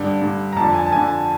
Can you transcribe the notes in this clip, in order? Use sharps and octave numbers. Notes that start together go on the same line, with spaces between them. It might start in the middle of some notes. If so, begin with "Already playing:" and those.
Already playing: G2 D3
G2 D3
A#5
F2 D3 A5
G#5
A5
F2 D3 G#5